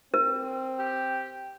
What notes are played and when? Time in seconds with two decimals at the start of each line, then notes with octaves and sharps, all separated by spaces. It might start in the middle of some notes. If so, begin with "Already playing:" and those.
0.14 C4 A#4
0.79 G4